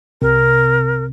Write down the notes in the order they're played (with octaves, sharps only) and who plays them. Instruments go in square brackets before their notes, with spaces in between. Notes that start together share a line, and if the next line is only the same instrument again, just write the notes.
[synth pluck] C2 C3 [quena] A#4